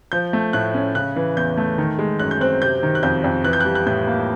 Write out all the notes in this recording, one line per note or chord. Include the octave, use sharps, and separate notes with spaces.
F3 G6
A3
A2 F#6
C#4
C#3 F#6
E3
E2 G6
A3
D#3
G#3
F#2 F#6
G6
C4 F#6
C3 G6
D#3
F#6
F2 G6
F2
E3 F#6
G6
G3 F#6
F#6
A2 G6
A#3